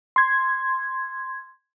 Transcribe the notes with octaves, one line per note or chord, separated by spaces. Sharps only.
C6 G#6